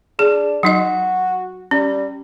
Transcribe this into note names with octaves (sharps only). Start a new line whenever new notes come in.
D4 G#4
F#3 D#4 F#4 D#5
G3 C#4